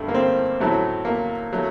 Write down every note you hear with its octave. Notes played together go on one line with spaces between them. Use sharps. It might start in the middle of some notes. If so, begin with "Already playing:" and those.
Already playing: G2 D3 G3 A3
A#3
C4
A2 F#3 A3
A#3
F#3 A3